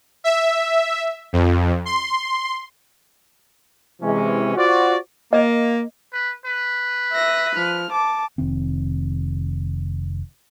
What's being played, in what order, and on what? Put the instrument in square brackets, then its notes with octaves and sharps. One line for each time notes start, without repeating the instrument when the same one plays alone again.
[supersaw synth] E5
F2
C6
[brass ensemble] C3 E3 G#3 C#4
F4 F#4 C5 D5
[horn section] A#3 [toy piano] D#5
[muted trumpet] B4
B4
[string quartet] E5 A#6
F3 F6
A5 D6
[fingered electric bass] F1 D#3 C4